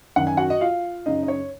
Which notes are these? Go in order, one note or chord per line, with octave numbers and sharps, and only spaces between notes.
F#2 D#3 F#5
G#5
F#4 F#5
D#5
F4 F5
F#2 C#3 D#4 D#5
D#5
C#5